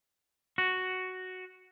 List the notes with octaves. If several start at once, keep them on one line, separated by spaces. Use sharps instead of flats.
F#4